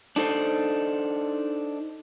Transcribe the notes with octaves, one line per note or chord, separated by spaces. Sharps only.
D4 D#4 A4 C5